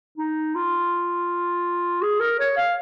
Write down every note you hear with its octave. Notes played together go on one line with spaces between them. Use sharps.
D#4
F4
G#4
A#4
C#5
F5